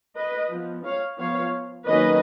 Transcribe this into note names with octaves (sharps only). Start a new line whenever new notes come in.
B4 D#5
F3 B3
C#5 F5
F3 B3 C#5 F5
D#3 F#3 A#3 C#4 B4 D#5